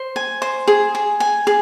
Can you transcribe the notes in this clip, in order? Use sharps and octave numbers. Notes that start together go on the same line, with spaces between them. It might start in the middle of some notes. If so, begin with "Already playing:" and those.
Already playing: C5
G#5
C5
G#4
G#4
G#5
G#4